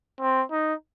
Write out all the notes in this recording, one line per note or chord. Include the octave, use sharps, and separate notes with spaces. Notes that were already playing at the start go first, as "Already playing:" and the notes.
C4
D#4